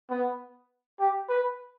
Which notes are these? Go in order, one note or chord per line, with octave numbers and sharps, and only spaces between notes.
B3
G4
B4